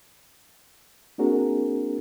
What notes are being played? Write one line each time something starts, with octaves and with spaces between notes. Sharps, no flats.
A#3 C4 D4 F#4 G#4 A#4